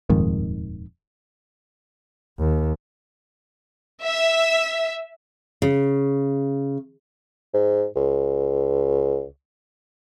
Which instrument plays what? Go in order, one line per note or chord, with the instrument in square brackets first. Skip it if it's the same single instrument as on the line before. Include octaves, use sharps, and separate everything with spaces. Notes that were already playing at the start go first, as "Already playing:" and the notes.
[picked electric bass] D#1 F2 G#2 D#3
[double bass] D#2
[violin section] E5
[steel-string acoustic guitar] C#3
[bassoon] G#2
C#2